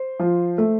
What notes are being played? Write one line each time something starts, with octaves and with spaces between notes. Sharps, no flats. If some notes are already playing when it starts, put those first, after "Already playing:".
Already playing: C5
F3
A3